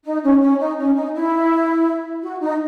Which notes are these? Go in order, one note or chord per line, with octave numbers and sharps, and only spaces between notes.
D#4
C#4
C#4
D#4
C#4
D#4
E4
F#4
D#4